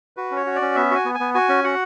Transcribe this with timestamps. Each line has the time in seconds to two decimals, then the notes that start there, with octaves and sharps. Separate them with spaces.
0.17 F#4 B4
0.31 C#4
0.37 C#5
0.46 F#4
0.56 D5
0.61 C#4
0.75 B3 E5
0.91 F#4 G#5
1.05 B3
1.15 G#5
1.20 B3
1.34 F#4 G#5
1.49 C#4
1.64 F#4 F#5